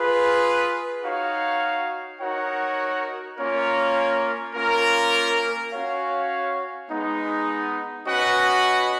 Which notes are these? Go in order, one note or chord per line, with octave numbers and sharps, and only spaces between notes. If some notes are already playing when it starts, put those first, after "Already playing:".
Already playing: F4 G#4 B4
D#4 F#4 C#5 F5
D#4 F#4 A#4 C#5 F#5
A#3 C#4 F4 A#4 C#5
A#3 C#4 F4 A#4
C#4 F#4 C#5 F5
G#3 B3 D#4
C#4 F#4 B4 D#5 F#5